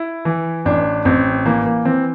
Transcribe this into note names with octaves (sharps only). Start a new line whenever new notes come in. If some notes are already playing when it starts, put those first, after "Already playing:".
Already playing: E4
E3
A1 D4
A1 C4
E3 A#3
A#3
E3 C4